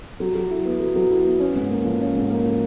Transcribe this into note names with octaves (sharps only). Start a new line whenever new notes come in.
F#3
F#3
E4
B3
F#3
F#3
E4
B3
C#4
G#2
A#3
F3
C#4
G#2
A#3
F3